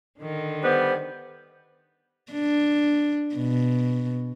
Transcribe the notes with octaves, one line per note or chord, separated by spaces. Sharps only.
D3 D#3
G3 B3 C5
D4
B2